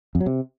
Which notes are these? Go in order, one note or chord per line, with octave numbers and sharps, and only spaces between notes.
F2
F#3
C3